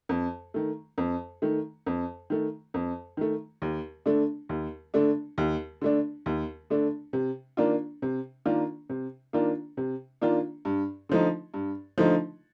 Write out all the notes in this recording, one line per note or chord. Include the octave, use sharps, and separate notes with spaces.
F2
D#3 A3
F2
D#3 A3
F2
D#3 A3
F2
D#3 A3
D#2
D3 A3 D4
D#2
D3 A3 D4
D#2
D3 A3 D4
D#2
D3 A3 D4
C3
D#3 A#3 D4 F4
C3
D#3 A#3 D4 F4
C3
D#3 A#3 D4 F4
C3
D#3 A#3 D4 F4
G2
D3 F3 A3 D#4
G2
D3 F3 A3 D#4